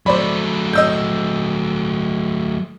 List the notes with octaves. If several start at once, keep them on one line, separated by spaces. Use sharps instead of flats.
F#3 A3 C5 D5 B5
D#5 E6 G6